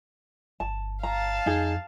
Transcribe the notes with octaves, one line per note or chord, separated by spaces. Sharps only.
G1 A5
F5 A5 A#5
F2 D#4 G#4